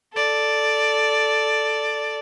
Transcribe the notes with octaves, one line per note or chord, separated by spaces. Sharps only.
A4 D5